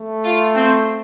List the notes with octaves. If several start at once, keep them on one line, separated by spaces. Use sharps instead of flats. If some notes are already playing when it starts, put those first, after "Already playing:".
Already playing: A3
F4
C4